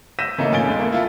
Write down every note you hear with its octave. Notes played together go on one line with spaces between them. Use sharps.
E6 G6 A#6 B6 D#7 E7
C#3 E3 A3 A#3 D#4
A#2 C#3 G#5 A6 D7 G7
E2 G#3
A3 A#3
E4 F4 A4